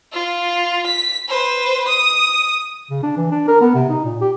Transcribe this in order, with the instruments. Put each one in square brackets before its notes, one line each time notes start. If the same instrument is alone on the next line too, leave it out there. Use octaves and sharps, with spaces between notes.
[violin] F4
B6
B4 C5
D#6
[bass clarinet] C#3
D4
E3
D4
A#4
B3
C3
D#4
A#2
G4